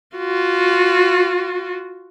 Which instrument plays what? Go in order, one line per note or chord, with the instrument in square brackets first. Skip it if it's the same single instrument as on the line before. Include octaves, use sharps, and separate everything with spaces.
[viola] F4 F#4